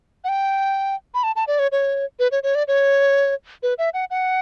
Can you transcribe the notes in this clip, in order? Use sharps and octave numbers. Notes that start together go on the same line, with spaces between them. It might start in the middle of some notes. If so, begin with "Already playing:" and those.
F#5
G5
B5
A5
A5
D5
C#5
C#5
B4
C#5
C#5
D5
C#5
B4
E5
F#5
F#5